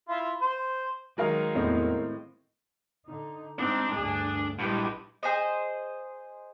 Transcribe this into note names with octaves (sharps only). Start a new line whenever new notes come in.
E4 F4
C5
D#3 F#3 G#3 A#4 F5
E2 A2 C4 D#5
D3 D#4
G#3 C4 D4 D#4 D5
D2 G2 G#4
A#1 G2 G#3 E4 G4
G#4 C5 D#5